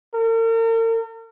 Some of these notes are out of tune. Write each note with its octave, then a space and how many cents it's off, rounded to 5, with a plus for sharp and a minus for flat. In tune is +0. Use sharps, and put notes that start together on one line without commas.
A#4 -45